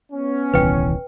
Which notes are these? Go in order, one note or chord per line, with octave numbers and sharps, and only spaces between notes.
B3 C#4
D#1 C2 E3 B4 G5